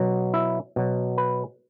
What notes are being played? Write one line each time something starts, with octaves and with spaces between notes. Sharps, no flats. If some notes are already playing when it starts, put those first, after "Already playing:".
Already playing: B2 F#3
E4
B2 F#3
B4